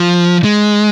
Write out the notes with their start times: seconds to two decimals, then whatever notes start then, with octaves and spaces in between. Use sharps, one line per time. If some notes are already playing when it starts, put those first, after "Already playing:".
Already playing: F3
0.44 G#3